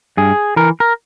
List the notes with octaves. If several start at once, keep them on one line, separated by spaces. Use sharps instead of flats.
G2 G#4
E3 A#4
A#4